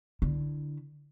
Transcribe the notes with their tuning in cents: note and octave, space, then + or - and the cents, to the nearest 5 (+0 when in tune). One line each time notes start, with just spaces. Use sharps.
D3 +0 E4 +0